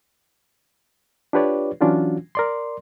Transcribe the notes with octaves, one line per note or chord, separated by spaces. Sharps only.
D4 F4 G4 B4 C#5 D5
E3 F#3 C#4 D4 F4 F#4
A#4 D5 C6